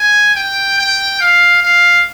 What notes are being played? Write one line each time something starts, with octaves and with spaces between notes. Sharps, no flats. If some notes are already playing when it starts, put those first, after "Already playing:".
Already playing: G#5
G5
G5
F5
F5